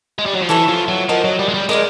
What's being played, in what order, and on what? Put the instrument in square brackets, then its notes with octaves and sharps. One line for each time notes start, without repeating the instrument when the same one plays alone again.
[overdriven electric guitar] G#3
G3
F#3
F3
[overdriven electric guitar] E3 [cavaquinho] E4 A4 C#5 E5
[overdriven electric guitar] F3
F#3
[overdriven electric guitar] F3 [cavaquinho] F#4 A#4 D#5
[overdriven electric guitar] F#3
G3
G#3
G3
[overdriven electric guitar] G#3 [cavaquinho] A#4 D5 F5